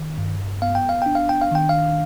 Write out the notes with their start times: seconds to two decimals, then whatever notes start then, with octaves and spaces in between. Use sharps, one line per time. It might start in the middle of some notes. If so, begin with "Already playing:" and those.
Already playing: D#3
0.18 G2
0.62 B3 F5
0.75 G5
0.89 F5
1.02 D4 G5
1.15 F5
1.29 G5
1.42 F5
1.51 D#3 G5
1.69 F5